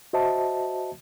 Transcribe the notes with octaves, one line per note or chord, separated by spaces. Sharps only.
F#4 C5 D#5 E5 A5